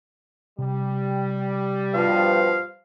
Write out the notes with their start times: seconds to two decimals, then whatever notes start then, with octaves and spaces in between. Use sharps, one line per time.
0.59 C3 G3
1.94 G2 B2 F3 F5